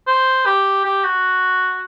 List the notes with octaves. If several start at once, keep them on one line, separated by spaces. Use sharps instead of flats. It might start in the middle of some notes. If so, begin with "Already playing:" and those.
C5
G4
G4
F#4